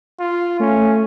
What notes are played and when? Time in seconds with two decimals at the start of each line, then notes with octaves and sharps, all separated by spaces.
0.20 F4
0.60 A3 C#4